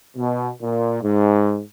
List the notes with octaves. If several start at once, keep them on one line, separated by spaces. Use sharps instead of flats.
B2
A#2
G#2